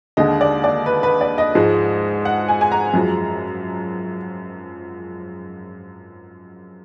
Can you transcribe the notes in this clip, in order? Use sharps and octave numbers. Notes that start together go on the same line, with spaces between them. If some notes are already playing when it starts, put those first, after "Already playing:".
D#2 D3 G#3 D#5
D5
D5
B4
B4
D5
D#5
G#2 F3 G#3
F#5
G#5
G#5
A#5
F#2 F3 G#3